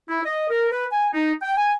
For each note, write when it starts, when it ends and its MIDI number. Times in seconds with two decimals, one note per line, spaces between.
0.09 0.21 64
0.25 0.50 75
0.50 0.69 70
0.72 0.86 71
0.92 1.09 80
1.14 1.33 63
1.42 1.54 79
1.57 1.73 80